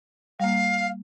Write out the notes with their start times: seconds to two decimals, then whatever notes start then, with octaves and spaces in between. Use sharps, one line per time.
0.40 G3 A#3 F5